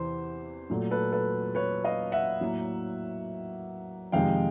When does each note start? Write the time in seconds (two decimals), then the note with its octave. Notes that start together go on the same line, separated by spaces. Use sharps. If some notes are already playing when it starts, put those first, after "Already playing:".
Already playing: E2 C3 E3 C5
0.70 A#2 F#3 A3
0.91 A4 B4
1.12 A4 B4
1.55 B4 C#5
1.85 D#5 F5
2.12 E5 F#5
2.41 A2 F#3 A#3
4.12 F2 C3 D#3 G#3 F5 G5